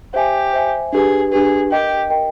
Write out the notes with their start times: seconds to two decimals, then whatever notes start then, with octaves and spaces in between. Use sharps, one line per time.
0.14 G4 C5 E5 G#5
0.53 C5 E5 G#5
0.93 D4 G4 G#4 B4
1.32 D4 G4 G#4 B4
1.71 G4 A#4 D#5 G5
2.10 A#4 D#5 G5